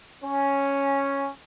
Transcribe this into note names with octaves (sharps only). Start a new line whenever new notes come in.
C#4